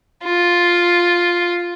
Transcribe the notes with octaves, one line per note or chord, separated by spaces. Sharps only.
F4